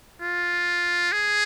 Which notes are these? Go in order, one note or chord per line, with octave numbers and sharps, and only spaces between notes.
F4
G#4